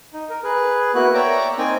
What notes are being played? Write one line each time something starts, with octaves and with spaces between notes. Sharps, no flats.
D#4
A#4
G#4 B4
A#3 B3 E4 F#4 F#6
C#5 D5 E5 G5 A#5 D6
A#3 C4 D#4 G5 G#5